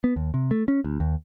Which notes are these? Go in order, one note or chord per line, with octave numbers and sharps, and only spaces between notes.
B3
D#2
C3
A3
C#4
D2
D#2